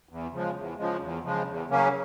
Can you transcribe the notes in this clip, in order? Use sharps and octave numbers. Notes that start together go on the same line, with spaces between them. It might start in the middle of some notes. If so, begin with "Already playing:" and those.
E2
C#3 F3 G#3
E2
C#3 F3 G#3
E2
C#3 F3 G#3
E2
C#3 F#3 A#3 C#4